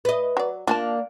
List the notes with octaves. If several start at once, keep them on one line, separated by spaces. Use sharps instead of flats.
B4 D#5
F#3 D5
A#3 D4 F4 G#5 A5